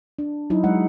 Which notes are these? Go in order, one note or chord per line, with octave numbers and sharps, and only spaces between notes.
D4
F#3 D#4 E4
F#3 G#3 E5 F#5